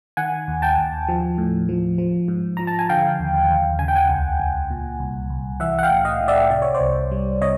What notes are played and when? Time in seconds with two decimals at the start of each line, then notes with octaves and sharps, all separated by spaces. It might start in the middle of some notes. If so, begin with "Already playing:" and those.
0.17 D#3 F#5 G#5
0.48 D#2
0.62 G5 A5
0.78 D#2
1.08 F3
1.38 A2
1.69 F3
1.98 F3
2.28 G#2
2.57 F3 A#5
2.67 A5
2.79 G#5
2.89 D3 F5 G5
3.19 D#2
3.49 D#2
3.79 C#3 G#5
3.88 G5
3.96 F#5 G#5
4.09 C#2
4.40 C#2
4.70 A#2
5.00 C2
5.30 C2
5.60 E3 E5 F#5
5.79 F#5
5.83 F5 G5
5.91 A2
6.05 D#5 F5
6.20 A2
6.28 D5 E5
6.50 C3 D5
6.62 C#5
6.75 C5 D5
6.81 C2
7.11 G3
7.41 C3 C#5 D#5